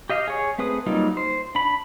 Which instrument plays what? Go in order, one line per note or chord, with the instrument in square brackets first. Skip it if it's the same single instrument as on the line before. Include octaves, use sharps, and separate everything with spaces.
[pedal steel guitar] G4 D#5 F5
G#4 C#5
A3 C4 G#4 B4 D#6
F#3 G3 A#3 D#4 F4
C5
D4 B5